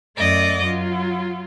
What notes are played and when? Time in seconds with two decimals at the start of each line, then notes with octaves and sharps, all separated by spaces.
0.17 F#2 A3 D5 D#5 D6
0.65 F#3 F4